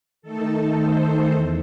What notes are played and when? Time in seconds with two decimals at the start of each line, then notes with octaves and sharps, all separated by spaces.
0.22 D#3 A3 D#4 A4
0.78 C5
1.32 E2